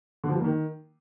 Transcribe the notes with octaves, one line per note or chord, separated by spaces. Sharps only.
D3
F3
G3
A#3
D#3